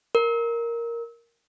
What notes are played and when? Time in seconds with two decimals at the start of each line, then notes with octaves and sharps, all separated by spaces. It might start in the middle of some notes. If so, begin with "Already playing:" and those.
0.15 A#4